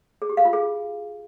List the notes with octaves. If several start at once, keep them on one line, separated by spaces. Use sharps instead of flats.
G#4
G4
F5
F4
G#4